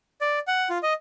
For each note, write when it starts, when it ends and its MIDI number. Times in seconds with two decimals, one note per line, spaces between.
0.21 0.39 74
0.47 0.69 78
0.70 0.78 65
0.83 0.93 75